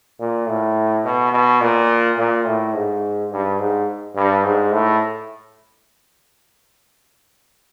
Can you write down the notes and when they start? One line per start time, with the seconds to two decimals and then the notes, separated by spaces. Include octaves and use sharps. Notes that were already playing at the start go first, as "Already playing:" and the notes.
0.20 A#2
0.48 A2
1.04 B2
1.32 B2
1.61 A#2
2.18 A#2
2.46 A2
2.74 G#2
3.31 G2
3.59 G#2
4.16 G2
4.44 G#2
4.72 A2